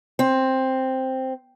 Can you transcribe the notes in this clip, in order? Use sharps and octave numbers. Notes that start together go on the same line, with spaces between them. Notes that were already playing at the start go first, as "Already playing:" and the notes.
C4